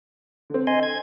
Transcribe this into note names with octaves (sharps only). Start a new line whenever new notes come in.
D3 C4
D#5 G#5 C6
G#6